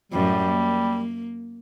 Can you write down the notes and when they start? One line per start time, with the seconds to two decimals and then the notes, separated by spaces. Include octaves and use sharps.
0.12 F#2 A2 G3
0.48 A#3